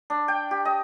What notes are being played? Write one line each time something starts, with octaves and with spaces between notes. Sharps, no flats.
D4
G5
G4
D#5